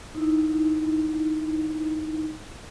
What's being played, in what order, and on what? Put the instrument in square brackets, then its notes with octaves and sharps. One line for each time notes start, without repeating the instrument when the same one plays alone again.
[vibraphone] D#4 E4